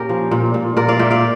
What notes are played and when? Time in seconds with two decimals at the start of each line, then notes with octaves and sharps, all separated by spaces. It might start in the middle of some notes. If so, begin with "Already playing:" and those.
Already playing: A#2 C#4 G4 A#4
0.09 F3
0.31 A#2
0.54 A#2
0.77 A#2 A#4 D5
0.88 D5 F5
0.99 A#2 E5 G5
1.11 D5 F5